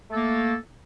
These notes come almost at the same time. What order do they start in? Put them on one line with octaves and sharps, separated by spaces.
A3 A4 A#3